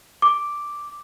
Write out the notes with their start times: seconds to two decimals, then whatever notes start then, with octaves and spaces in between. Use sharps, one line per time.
0.22 D6